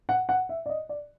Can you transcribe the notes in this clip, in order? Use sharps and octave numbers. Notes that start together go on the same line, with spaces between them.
F#5
F#5
E5
D5
D#5
D5